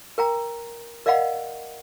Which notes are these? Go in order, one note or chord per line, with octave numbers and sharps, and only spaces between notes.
A#4 G5 A#5
A#4 D5 D#5 F5 F#5 B5